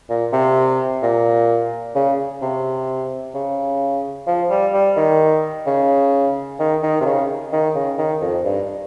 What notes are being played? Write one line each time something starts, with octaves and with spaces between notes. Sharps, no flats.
A#2
C3
A#2
C#3
C3
C#3
F3
G3
G3
D#3
C#3
D#3
D#3
C3
C#3
D#3
C#3
D#3
F2
G2